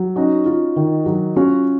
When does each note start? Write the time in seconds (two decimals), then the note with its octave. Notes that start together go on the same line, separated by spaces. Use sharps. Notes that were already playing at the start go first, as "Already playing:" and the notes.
Already playing: F#3
0.16 C#4 D#4 F#4
0.46 F4
0.76 D#3
1.06 F#3
1.36 C#4 F4 F#4